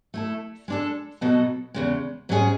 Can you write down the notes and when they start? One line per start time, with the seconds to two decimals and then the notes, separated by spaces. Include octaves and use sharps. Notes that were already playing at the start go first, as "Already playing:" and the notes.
0.14 A3 E4 A4
0.68 G#3 D4 A4
1.21 B2 F#3 B3 F#4 A4
1.74 E2 C#3 G#3
2.29 G#2 F#3 C#4 G#4